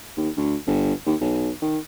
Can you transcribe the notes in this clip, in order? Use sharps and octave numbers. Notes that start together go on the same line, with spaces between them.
D#2
D2
G1
D#2
B1
D#3